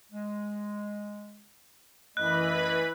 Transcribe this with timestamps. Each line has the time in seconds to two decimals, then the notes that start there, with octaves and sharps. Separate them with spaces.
0.12 G#3
2.17 F#2 E3 A3 B4 D#5 B5 F#6